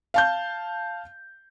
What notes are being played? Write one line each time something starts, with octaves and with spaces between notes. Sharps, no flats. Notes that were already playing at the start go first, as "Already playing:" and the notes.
F5 A5 G6